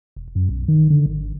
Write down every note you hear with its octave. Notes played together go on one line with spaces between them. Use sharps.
E1
F#2
B1
D#3
D3
G#1